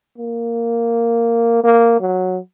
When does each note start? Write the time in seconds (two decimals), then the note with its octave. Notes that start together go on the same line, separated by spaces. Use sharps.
0.18 A#3
1.64 A#3
2.00 F#3